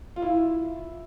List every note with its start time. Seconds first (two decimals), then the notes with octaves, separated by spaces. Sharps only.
0.16 F4
0.22 E4